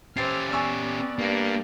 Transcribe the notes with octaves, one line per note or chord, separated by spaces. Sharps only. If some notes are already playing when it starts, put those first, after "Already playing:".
C#4 G4 C5 D6 E6 F6 A6 C7
B3 D5 G#5 C#6 E6
G2 A#3